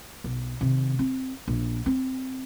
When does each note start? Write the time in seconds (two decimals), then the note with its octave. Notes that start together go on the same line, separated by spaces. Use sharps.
0.24 B1
0.61 C3 D#3
0.99 C4
1.48 A#1
1.86 C4